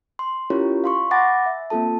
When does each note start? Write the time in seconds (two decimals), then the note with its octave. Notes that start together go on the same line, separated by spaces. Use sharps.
0.19 C6
0.50 C#4 E4 F4 G4 A#4 C#5
0.84 F5 C6 C#6
1.11 F#5 G#5 B5 D6 A6 A#6
1.46 E5
1.70 A#3 C4 F4 A4 A5